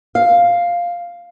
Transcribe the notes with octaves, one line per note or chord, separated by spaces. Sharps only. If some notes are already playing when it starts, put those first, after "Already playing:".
F5